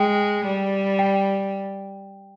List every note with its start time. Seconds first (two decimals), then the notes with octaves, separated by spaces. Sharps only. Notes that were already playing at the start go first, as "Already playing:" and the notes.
Already playing: G#3 G5
0.46 G3
0.99 G5